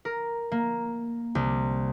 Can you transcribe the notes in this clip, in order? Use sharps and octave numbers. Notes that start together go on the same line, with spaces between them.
A#4
A#3
C2